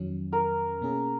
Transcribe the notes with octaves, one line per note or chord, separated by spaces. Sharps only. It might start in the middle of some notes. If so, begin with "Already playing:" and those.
Already playing: F2 D#3 F#3 C#4
A#4
B2 A#3 C#4 G#4